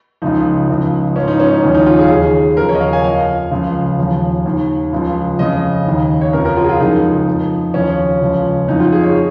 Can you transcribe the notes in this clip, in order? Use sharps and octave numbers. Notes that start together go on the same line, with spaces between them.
C#2 C#3 F3 D#4
C#2 C#3 F3
G#2 F3 C#4
D#4
C#4
D#4
D#2 C#3 F3 C#4
D#4
F4
G#4
D#2 D#3 G#4
D#2 C#3 F3 A#4
C#5
D#5
F5
G#5
F2 F3 F5
C#2 C#3 F3
D#2 C#3 F3
D#2 D#3
C#2 C#3 F3
F2 C#3 F3 D#5
D#2 D#3
C#5
F2 C#3 F3 A#4
A#4
F4
G#4
F4
C#2 C#3 F3 D#4
F2 F3
D#2 C#3 F3 C#4
C#2 C#3 F3
F2 C#3 F3 D#4
F4
G#4
C#5